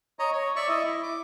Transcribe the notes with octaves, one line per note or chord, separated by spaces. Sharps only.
C#5 D#5 A#5
C#5
D5 E5 C#6
E4 D#5 E5
E4
D6